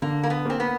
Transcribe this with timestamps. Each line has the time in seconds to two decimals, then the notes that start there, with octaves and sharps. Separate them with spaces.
0.02 D3 A#3
0.23 A#3
0.30 B3
0.45 A#3 C4
0.60 B3